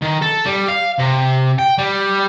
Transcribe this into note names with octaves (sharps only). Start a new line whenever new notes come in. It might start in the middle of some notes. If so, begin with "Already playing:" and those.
D#3
A4
G3
F5
C3
G5
G3